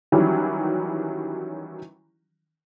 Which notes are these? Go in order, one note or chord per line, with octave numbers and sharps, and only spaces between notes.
D#3 E3 F#3 G3 C#4 E4